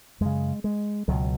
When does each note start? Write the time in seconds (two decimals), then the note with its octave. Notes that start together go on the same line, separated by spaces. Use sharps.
0.21 F#2 C#3 G#3
0.64 G#3
1.08 C#2 B2 F#3